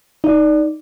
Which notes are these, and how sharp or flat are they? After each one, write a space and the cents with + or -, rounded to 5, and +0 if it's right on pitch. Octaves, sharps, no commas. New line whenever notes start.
D#4 +0 D5 +0